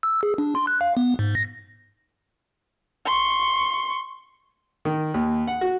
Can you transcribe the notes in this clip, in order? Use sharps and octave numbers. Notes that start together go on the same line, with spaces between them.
E6
G#4
D4
C6
F#6
F5
B3
G#2
A#6
C6 C#6
D#3
D#2
F#5
F#4